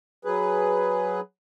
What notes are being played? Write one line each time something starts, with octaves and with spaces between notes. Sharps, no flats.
F#3 G#4 B4